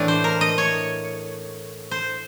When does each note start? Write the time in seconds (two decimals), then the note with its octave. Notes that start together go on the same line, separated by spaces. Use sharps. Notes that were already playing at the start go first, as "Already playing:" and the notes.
Already playing: A2 E3 A3 D4
0.08 C5
0.24 A#4
0.41 D#5
0.58 C#5
1.91 C5